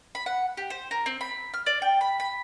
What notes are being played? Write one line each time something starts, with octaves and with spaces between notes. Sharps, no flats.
B5
F#5
G4
C5
A#4
C4
B5
F6
D5
G5
B5
B5